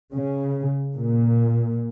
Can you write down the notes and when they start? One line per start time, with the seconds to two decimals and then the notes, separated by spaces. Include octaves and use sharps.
0.13 C#3
0.95 A#2